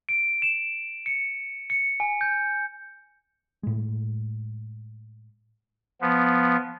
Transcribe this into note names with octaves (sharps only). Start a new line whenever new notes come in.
D7
E7
C#7
C#7
G#5
G6
A2 G#3
F3 B3